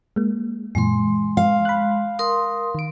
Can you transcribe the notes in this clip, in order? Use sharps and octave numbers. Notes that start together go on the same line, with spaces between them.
G#3 A#3
F#2 A#2 E3 G#3 C6
F5
B5 F#6
A#4 C6 D#6
D#3 D7